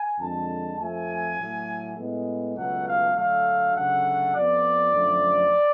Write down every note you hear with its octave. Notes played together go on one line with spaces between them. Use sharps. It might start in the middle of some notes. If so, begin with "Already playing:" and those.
Already playing: G#5
F2 D3 G#3 A5
F2 F3 A3 G#5
A2 F#3 A3
A2 G#3 B3
C#2 B2 F#3 A3 F#5
F5
D2 D3 F#3 A3 F5
D2 C#3 F#3 A3 F#5
F2 F3 B3 D5
F#2 D3 F3 A3